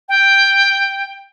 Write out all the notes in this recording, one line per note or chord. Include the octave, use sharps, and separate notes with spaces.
G5